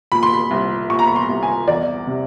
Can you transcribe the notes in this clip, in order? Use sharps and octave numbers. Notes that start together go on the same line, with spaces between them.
A#2 B5
C6
B5
C2
A#2 C#6
A#5
B5
C6
C2
G#5
E2 D5
C3